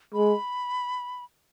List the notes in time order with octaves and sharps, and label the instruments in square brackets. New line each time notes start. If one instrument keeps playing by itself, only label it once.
[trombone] G#3 [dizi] B5